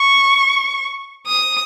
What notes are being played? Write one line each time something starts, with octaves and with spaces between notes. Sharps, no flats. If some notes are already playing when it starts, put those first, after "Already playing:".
Already playing: C#6
D#6